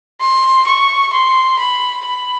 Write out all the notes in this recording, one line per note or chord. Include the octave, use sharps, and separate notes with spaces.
C6
C#6
C6
B5
B5